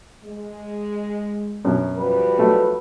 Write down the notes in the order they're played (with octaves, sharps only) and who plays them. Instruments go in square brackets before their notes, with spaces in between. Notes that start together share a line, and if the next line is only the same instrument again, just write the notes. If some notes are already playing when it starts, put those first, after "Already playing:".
[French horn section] G#3
[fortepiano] F#2 B2
[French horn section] F3 G3 F#4 [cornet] B4
[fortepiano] F#3 A3 B3